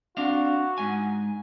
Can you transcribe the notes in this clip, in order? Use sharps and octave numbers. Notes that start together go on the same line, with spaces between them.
C4 D4 F#4 F5
G#2 G#5